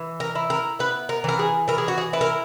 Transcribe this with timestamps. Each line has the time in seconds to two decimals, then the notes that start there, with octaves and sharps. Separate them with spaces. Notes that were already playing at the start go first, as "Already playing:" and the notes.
Already playing: E3
0.20 A#4
0.35 E4
0.50 A#4
0.79 B3 B4
1.09 A#4
1.24 E3 A#4
1.39 G#4
1.68 E3 A#4
1.78 G#4
1.88 F#4
1.98 G#4
2.13 E4 B4
2.21 A#4